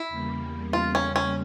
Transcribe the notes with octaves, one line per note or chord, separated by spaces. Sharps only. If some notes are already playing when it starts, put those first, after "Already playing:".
Already playing: E4
E2 C#3 G3 A#3
F4
C#4
C#4